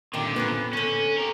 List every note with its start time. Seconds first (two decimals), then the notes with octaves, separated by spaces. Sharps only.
0.14 A#2 D3 D#3 F4 G4
0.36 B3 C#4 G4
0.73 D3 C#4 A4
1.17 G4 A#4